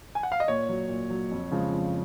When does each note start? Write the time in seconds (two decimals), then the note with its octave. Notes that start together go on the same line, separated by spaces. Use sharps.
0.15 G#5
0.23 F#5
0.32 F5
0.40 D#5
0.48 A#2 C#5
0.69 F#3
0.89 A#2
1.10 F#3
1.31 F2
1.52 C#3 F3 G#3
1.72 F2